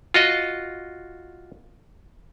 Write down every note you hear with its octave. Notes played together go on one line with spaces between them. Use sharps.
F4 F#4 D#5